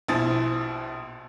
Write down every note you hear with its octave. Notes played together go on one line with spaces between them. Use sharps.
A#1 B2 E4 C5 G#5 A6